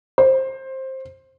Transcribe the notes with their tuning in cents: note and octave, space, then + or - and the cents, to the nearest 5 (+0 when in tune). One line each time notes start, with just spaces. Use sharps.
C5 +15